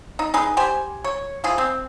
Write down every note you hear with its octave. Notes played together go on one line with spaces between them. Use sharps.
D#4
D#4 G#4 B4
G4 C5 G#5
C#5
E3 F3 G#4
C4